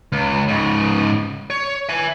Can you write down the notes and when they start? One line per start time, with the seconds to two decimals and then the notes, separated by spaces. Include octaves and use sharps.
0.12 C#2
0.48 G#2 C#3
1.50 C#5
1.89 E5 G#5